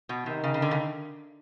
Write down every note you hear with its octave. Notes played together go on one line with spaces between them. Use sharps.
B2
C3 D#3
C#3
C#3
D3
C#3